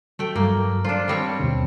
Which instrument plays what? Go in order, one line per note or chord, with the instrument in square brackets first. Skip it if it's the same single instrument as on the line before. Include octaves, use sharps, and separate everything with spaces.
[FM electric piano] F#3 [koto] A3 G5
[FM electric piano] G2 F#3 [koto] A#3
[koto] D4 F4 [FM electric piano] C5 A5
[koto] G3 C4 C#5
[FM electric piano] D#2 B2 D3